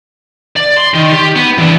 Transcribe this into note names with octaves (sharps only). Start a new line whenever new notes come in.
D5
C6
D#3
G4
B3
E3 D4